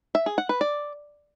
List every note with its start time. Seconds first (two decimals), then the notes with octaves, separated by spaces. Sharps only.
0.15 E5
0.26 G#4
0.38 F#5
0.49 B4
0.61 D5